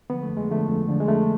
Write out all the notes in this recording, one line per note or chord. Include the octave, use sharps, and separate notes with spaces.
D3 F3 B3
A3
F2
G#3
D3 F3 A3
F2
D3 F3
G#3
F2 A3